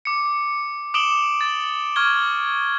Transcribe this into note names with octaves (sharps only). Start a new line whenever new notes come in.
D6 C#7
D6 D#6 D7 E7 F#7 G7
A6
C#6 F6 G#6 G7